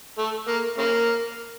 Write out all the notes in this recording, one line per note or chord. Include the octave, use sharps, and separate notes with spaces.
A3
A#3
C#3 A#3